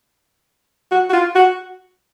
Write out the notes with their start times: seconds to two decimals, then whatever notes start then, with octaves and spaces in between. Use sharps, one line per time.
0.91 F#4
1.09 F#4
1.13 F4
1.35 F#4